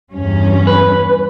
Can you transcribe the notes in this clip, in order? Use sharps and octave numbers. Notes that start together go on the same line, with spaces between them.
E2 G2 C#4
B4